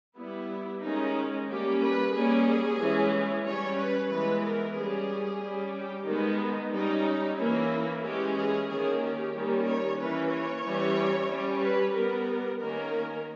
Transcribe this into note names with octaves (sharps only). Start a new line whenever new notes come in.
G3 B3 E4
D#3 G#3 C#4 D#4
G3 A#3 C#4 G4
B4
G3 A#3 C#4 G#4
E3 G#3 C#4
G3 C#4 C#5
B4
E3 G#3 B3 B4
A#4
G3 C#4 G#4
G3 C#4
G4
D#3 G#3 B3 D#4
G3 C#4 D#4
E3 A#3 C#4 E4
E3 G#3 C#4 G4
G#4
D#3 A#3 C#4 G#4
G4
D#3 G3 A#3 C#4
C#5
E3 A#3 C#4 B4
C#5
E3 G3 C#4
G3 C#4
B4
G3 B3 A#4
D#3 A#3 C#4 A#4